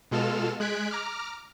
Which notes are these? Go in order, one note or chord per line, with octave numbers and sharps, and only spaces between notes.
B2 G#3 F4 A4 F6 E7
G#3 F#6 G#6 B6 D7
A#5 D6 F6